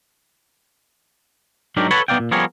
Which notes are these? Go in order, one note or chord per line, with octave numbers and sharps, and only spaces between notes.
G#2 F#3 D4 D#4 G4 A#4
A4 B4 C#5 F#5 A5 B5
B1 B3 D#4 D5 F5 G5
A#2
F3 G3 B3 G#4 A#4 C#5